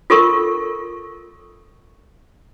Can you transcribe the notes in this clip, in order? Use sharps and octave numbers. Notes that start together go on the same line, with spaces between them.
F4 A4 A#4 C#6